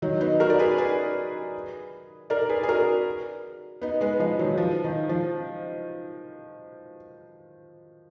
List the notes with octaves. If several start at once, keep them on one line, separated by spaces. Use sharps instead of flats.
D#3 F#3
B3 D#4
F#4 A#4
D5
G#4 B4
G#4 B4
A#4 D5
G#4 B4
G#4
F#4 A#4
B3 D#4
G#3 B3
F3 G#3
D#3 F#3
F3
D#3
F3